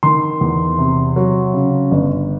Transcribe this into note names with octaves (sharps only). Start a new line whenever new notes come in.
D#3 C6
E2
C3
F#3
C#3
G1